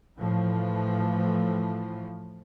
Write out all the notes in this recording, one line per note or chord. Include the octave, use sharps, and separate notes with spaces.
A2 E3 F3